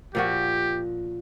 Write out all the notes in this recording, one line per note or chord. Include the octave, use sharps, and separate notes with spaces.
A#2 F3 F#4 G4